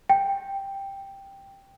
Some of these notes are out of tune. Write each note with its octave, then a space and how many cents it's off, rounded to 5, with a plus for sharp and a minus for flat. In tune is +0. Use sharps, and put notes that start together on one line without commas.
G5 +5